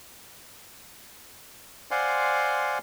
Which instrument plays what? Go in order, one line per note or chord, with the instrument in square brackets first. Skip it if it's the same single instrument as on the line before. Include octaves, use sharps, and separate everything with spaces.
[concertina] C5 D5 F5 F#5 G#5 C6